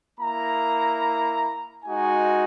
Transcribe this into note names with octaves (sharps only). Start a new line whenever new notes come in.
A#3 E4 A#5
G#3 D#4 F#4 G#5